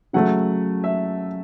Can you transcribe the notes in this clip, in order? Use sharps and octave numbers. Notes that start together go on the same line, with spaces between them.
C#3 F#3 A3 F#5
E5